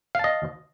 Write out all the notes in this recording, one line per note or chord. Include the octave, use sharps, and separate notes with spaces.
D#5 F5 A5